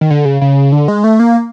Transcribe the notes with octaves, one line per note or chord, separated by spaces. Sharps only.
D#3
D3
C#3
C#3
D3
G#3
A3
A#3